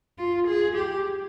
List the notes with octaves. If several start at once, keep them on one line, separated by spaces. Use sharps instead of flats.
F4
G#4
G4